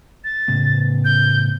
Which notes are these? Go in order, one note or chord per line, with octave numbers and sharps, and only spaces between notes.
A6
A2 C#3 B3
G6